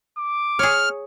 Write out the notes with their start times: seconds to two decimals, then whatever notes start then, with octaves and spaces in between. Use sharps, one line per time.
0.18 D6
0.59 G#4 C#5 F6